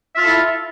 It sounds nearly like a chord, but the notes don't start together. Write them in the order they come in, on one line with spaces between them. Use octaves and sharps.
E5 F4 A4 E4